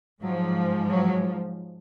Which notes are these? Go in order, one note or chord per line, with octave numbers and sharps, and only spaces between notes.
G#2 F3 F#3
F#3